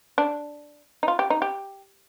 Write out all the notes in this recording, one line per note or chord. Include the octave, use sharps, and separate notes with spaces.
D4
D#4
F4
G4
D#4
G4